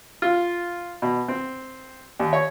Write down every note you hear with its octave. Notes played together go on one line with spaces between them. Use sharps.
F4
B2
C4
D#2
C#5